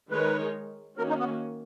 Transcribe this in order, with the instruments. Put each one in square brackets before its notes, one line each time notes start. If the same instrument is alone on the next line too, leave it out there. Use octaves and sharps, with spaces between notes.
[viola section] D#3 G#3 D#4 A#4 C#5 [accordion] B4
[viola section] D#3 A#3 C#4 F#4 [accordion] A#4
[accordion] D#4
B3